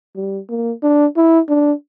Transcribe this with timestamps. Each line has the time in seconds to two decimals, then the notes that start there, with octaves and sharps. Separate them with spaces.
0.16 G3
0.49 A#3
0.83 D4
1.16 E4
1.49 D4